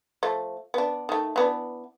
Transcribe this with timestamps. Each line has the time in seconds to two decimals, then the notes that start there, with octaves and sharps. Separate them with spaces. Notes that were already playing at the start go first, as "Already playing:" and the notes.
0.23 F3 A3
0.74 B3 D4
1.09 D#3 A3
1.36 E3 B3 D4